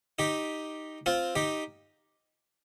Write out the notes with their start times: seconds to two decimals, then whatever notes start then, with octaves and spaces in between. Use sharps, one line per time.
0.19 D#4 G4
1.06 C4 F4
1.36 D#4 G4